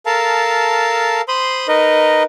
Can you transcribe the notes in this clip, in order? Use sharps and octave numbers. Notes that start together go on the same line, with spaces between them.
A4 A#4 F5 A5
C5 B5 C6 D#6
D#4 A#4 B4 D#5